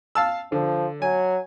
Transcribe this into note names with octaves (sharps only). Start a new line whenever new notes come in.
F5 A5 E6
D3 F3
F#3 G#5